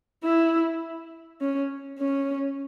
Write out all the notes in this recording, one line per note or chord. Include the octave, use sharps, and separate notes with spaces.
E4
C#4
C#4